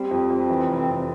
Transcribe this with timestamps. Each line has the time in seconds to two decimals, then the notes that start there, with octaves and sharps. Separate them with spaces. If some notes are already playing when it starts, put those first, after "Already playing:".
Already playing: G3 C4
0.11 F2
0.30 F2
0.49 E3
0.67 F1
0.87 F1